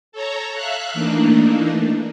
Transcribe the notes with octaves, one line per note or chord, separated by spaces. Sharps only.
A4 C#5 A#5
E5 F5 F#6
E3 A3 A#3 D4 D#4